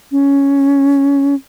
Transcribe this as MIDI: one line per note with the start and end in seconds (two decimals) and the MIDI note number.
0.12 1.35 61